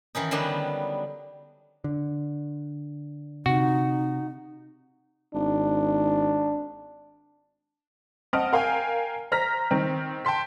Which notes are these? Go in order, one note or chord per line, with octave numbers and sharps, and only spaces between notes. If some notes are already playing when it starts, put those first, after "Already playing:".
D#3 E3 C#4 D#4
D3 D#3 F#3 G3 B3 D4
D3
C3 D#4 F#4
G#1 D4
C4 D#5 F#5 A5 F6 D7
A#4 F5 G5 G#5
C5 A#5 F6 A#6 B6
D#3 C4
G5 A5 C6 B6